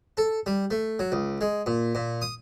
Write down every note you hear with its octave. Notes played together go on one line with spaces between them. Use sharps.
A4
G3
A3
F#3
C#2
G#3
A#2
A#2
D#6